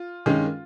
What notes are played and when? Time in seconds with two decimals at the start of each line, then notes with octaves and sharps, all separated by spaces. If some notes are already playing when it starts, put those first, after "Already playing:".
Already playing: F4
0.26 G2 D#3 G#3 C#4